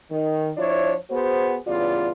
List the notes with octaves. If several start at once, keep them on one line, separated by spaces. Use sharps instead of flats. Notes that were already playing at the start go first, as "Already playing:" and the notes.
D#3
F3 D4 E4 C#5
B3 F#4 G#4 C5
E2 G2 C#3 F4 D5